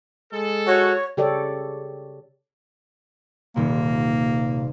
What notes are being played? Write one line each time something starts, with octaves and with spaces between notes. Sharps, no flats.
G#3 A4
F#4 C#5
C#3 G4 A4 C#5 D5
D#1 C3 A#3